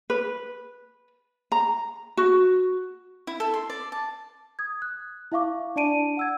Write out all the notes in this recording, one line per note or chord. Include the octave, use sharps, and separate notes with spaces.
B4
A#5
F#4
E4
A4
C6
D5
A5
D#6 G#6
F#6
E4 E5 F5 C#6 D6
D4 D5 A5 D7 D#7
F#5 E6 G#6